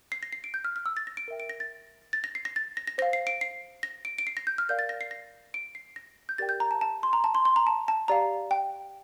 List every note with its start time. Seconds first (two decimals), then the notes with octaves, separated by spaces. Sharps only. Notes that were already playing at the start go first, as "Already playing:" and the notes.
0.12 C7
0.23 A#6
0.33 C7
0.44 D7
0.54 G6
0.64 F6
0.76 F6
0.86 E6
0.97 A6
1.07 A#6
1.17 D7
1.28 A#4 E5 G5
1.40 D7
1.50 A#6
1.60 A6
2.13 A6
2.24 A#6
2.35 C7
2.45 A#6
2.56 A6
2.77 A#6
2.87 A#6
2.98 C5 F5 A#6
3.13 C7
3.27 D7
3.41 C7
3.83 A#6
4.05 D7
4.18 D7
4.27 C7
4.37 A#6
4.47 G6
4.58 F6
4.69 A#4 D5 F5 G6
4.79 A6
4.89 A#6
5.01 C7
5.11 A#6
5.54 D7
5.75 C7
5.96 A#6
6.29 G6
6.38 G4 A#4 D5 G5 A6
6.49 G6
6.60 A#5
6.71 A5
6.81 A5
7.03 C6
7.13 A#5
7.24 A5
7.35 C6
7.45 C6
7.56 A#5
7.67 A5
7.88 A5
8.08 G4 D5 F5 A#5
8.51 G5